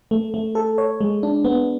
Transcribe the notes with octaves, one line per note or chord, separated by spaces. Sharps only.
A3
A3
A4
C#5
G#3
D4
B3